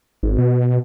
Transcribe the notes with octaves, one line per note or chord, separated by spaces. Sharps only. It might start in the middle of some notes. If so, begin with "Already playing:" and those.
G#1
B2